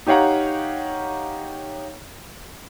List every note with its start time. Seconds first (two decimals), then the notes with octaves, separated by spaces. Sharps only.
0.07 D#4 G4 C#5 F5 F#5 A#5